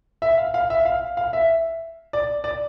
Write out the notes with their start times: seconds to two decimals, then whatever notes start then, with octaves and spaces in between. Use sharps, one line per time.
0.22 E5
0.38 F5
0.54 F5
0.70 E5
0.85 F5
1.17 F5
1.33 E5
2.13 D5
2.44 D5